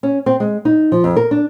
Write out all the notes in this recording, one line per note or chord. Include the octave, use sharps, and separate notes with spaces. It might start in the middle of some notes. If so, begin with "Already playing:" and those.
C#4
C4
G#3
D#4
F3
F2
A#4
D4